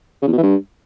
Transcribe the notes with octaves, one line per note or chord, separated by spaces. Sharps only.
C#3
E2
B2
E3
G2